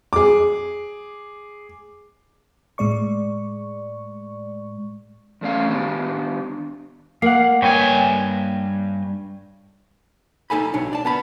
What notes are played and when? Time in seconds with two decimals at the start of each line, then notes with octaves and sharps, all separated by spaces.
0.13 G#4 D6
2.78 A2 G#3 D5 C#6
5.41 E2 A3 C#4 F5
5.69 D#3 B3 D4
7.22 A#3 F5 F#5
7.62 G2 B4 C#5 G5 G#5
10.50 D#4 A4 G#5 B5
10.74 B1 D4 C#5
10.93 D5 A5
11.05 B3 A5 B5